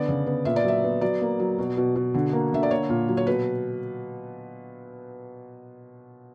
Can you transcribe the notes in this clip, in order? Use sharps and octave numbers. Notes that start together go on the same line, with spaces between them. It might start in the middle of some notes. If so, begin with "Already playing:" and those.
Already playing: D3 B3 D5
C#3
B3
A#2 E5
D5
F#3 E5
B3
F#3 D5
A#3
F#3
B2
B2
B2
D3
A#3
D3 E5
D5
A#3 C#5
A#2
F#3
C#5
B2 B4